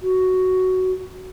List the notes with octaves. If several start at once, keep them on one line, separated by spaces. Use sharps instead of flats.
F#4